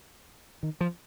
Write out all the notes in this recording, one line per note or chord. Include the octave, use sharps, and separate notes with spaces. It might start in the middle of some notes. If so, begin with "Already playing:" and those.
D#3
F3